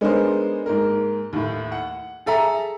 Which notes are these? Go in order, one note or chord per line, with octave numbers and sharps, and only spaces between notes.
G#3 B3 D4 D#4 A#4 C5
G#2 A#3 A#4
D#2 A2
F#5
G#4 A4 E5 A#5